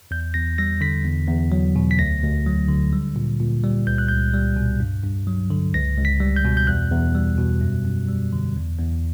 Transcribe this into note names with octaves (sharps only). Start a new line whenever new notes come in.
E2 G6
E2 A#6
G3 A#6
D3 B6
E2
E2
F#3
B2
B6
D2 A#6
D2
F#3
D3
G3
A#2
A#2
G3
C#2 G6
F#6
C#2 G6
G3
B2
G2
G2
F#3
D3
C#2 A#6
C#2
B6
G3
G6
B2
G6
E2 F#6
E2
G3
B2
F#2
F#2
G3
D3
E2
E2